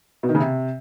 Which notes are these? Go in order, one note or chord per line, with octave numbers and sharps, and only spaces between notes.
B2
D#3
C#3
C3